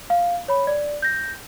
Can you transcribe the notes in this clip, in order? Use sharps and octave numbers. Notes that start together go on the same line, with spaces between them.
F5
C#5 B5
D5
G6 A#6